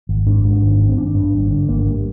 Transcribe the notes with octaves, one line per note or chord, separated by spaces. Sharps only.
G#1
G#2 D4
G#2
G#1
G#1
C4
G#1 D4
G2
G#1
D3
G#1 A#3
G2